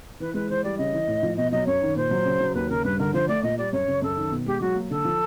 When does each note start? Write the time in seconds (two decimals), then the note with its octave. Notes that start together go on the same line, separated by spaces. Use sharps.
0.20 E3 B4
0.34 G#3 B4
0.49 E3 C5
0.64 G3 D5
0.78 C#3 D#5
0.93 E3
1.08 A2
1.23 F3
1.37 B2 D#5
1.52 F#3 D#5
1.66 F#2 C#5
1.82 D#3
1.96 A#2 C5
2.11 F#3
2.25 C#3
2.40 F#3
2.55 D#2 B4
2.70 C#3 A#4
2.85 G2 B4
2.99 D3 A#4
3.14 F3 C5
3.28 A3 D5
3.43 A#2 D#5
3.58 G3 D5
3.73 F#2 C#5
3.88 C#3
4.02 F#2 A4
4.17 D#3
4.31 B2
4.46 G#3 G4
4.61 F#3 F#4
4.76 A#3
4.90 D3 A4
5.05 F3